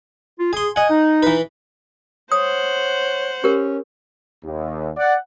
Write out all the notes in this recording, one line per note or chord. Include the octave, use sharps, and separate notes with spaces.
F4
G#4 G#5 C6
D#5 F#5 G#5
D#4
E3 B4
C5 C#5 F#5 D#6
C#4 G4 A#4
D#2
D5 F#5